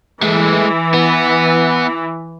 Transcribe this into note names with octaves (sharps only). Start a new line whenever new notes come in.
E3 G#3 A3
B3